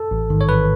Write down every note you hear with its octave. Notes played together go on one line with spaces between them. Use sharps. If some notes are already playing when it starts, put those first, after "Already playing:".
Already playing: A4
A1
G#2 D#3
C#5
A1 B4